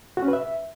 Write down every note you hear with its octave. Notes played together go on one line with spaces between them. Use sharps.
F#4
C#4
B4
E5